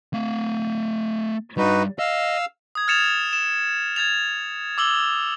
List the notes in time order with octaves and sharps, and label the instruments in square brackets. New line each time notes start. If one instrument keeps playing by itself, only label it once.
[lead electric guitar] A3 F5
[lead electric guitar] G3 D4 [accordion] D#4 F#4 B4
[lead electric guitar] D#5 [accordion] F5 E6
[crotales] D#6 G#6
F6 G#6 A6 C#7 E7 F7
E7
G#6 A6 F7
D6 E6 F#7 G7